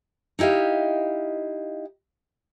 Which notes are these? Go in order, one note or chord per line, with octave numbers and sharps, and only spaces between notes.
D#4 E4 G4 D#5 F5